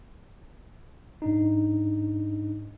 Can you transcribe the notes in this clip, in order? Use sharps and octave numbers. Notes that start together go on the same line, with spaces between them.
G#2 D4 D#4